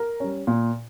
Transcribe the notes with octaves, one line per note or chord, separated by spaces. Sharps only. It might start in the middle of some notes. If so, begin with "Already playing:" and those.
Already playing: A#4
G3 C#4
A#2